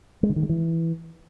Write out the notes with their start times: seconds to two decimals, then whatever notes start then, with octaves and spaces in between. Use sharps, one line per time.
0.23 G#3
0.30 D3
0.36 D#3
0.43 G#3
0.49 E3